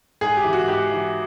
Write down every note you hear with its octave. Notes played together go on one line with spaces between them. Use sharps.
G#2 G#4
G4
E3
F#4
G#2 G4
E3